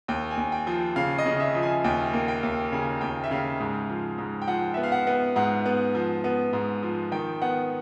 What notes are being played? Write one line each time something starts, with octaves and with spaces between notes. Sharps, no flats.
D#2 G5
G#5
D#2
G5
F3
C#3 F5
D#5
C#3
E5
F3
G#5
D#2 G5
A#3
G5
D#2
C#3 G#5
D#2 G5
E5
C#3 F5
G#2
F3
G#2
G5
F3 F#5
B3 E5
F5
F#5
B3
G#2 F#5
B3
F3
B3
G#2
F3
D#3 G5
B3 F#5